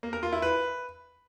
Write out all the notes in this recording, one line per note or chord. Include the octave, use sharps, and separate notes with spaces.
A#3
A#4
F4
E4
B4